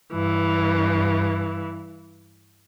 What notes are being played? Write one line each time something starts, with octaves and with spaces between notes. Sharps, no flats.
G2 E3